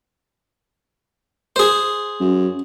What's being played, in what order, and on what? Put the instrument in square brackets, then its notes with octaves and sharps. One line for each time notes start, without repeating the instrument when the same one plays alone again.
[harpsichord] G#4 C5
[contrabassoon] F#2